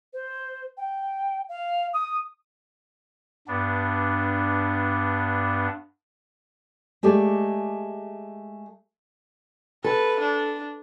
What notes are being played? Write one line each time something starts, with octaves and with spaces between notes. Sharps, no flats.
C5
G5
F5
D#6
G2 B3 D4
G#3 A3 G4 G#4 D5
A4 B4
D4